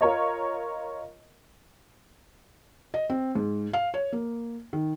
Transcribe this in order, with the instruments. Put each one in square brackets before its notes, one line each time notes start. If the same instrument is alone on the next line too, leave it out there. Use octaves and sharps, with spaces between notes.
[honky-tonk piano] F4 A#4 C#5 D#5
[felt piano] D#5
C4
G#2
F5
C#5
A#3
D#3